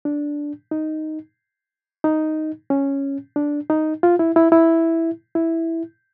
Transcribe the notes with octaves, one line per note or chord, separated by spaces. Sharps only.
D4
D#4
D#4
C#4
D4
D#4
F4
E4
E4
E4
E4